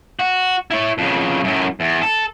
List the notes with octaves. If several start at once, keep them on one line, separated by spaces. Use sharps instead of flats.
F#4
E4 C#5
F2 C#3
F#2 A2
E2
A4